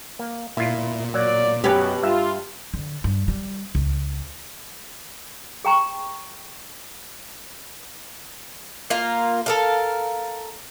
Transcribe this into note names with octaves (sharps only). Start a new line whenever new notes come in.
A#3
A#2 E4 F4
F#3 A#3 D5
F#2 B2 C#4 G4 B4
G2 F4 E5
D3
G2
G3
C#2
G#4 G5 A#5 C#6
A#3 F4 A#4
A4 A#4 F5